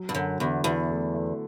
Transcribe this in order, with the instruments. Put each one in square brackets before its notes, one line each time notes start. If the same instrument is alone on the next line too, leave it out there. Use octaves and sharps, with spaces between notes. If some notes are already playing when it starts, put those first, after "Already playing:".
Already playing: [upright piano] F#3
[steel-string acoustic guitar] G2
[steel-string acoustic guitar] F#2 [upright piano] D3
[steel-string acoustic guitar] E2 [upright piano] D3
[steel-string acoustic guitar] E2 [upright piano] E4
[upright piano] A3
A3